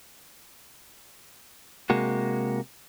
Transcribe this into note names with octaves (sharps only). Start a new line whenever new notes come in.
C3 G#3 A#3 F#4